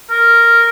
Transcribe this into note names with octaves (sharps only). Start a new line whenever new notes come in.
A#4